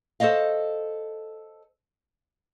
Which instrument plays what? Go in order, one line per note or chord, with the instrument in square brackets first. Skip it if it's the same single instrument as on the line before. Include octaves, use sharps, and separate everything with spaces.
[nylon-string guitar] A4 C5 C#5 D#5 F5